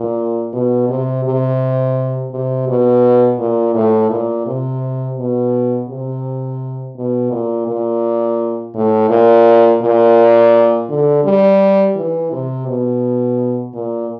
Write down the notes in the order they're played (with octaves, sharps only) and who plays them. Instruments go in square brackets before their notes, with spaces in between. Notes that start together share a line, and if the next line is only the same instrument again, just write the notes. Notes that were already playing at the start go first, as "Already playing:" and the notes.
Already playing: [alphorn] A#2
B2
C3
C3
C3
B2
A#2
A2
A#2
C3
B2
C3
B2
A#2
A#2
A2
A#2
A#2
D3
G3
E3
C3
B2
A#2